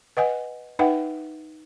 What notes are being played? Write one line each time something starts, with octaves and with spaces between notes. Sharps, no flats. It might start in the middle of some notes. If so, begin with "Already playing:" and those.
B4 D#5 F#5 G#5
D#4 B4 E5 F#5 G5